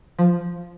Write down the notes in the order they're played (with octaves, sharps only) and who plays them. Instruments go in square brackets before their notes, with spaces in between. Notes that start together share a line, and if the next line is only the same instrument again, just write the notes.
[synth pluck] F3